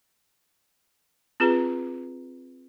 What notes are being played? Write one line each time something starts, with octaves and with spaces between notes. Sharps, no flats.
C4 F4 G#4 B4 A#5